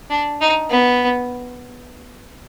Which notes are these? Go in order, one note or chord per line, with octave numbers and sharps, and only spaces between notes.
D4
D#4
B3